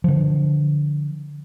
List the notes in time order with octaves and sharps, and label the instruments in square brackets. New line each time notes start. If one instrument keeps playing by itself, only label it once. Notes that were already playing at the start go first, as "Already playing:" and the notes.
[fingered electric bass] D3 F3